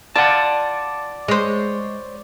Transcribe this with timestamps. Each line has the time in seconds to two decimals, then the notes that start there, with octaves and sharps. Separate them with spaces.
0.16 F4 D5 F#5 A5
1.28 G#3 C5 C#5